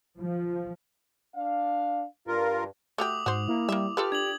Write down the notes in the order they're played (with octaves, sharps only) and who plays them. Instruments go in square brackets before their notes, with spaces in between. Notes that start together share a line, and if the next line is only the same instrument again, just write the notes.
[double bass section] F3
[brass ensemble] D4 F5
[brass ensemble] G2 [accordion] F4 A#4
[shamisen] A3 F#4 G4 [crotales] D6 D#6 F7
[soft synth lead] G#2 [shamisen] F#4 C5
[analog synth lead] A#3 [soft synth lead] E4
[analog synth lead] G3 [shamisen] A#3 E5
[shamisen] F4 A4 B4 [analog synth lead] G4 [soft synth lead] F6
[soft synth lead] D4 [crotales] G#6 F7 F#7